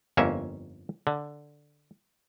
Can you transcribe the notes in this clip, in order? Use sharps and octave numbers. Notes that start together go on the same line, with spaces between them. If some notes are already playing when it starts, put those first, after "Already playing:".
G1 F2 A#3 C#4 E5
D3